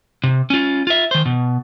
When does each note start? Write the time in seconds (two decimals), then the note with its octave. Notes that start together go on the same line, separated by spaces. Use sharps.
0.24 C3
0.50 C#4 F4
0.87 F4 E5
1.11 D#3 C5
1.26 B2